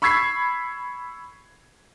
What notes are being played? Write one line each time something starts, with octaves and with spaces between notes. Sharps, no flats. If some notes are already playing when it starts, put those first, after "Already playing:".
B5 C#6 E6 G#6 B6 C7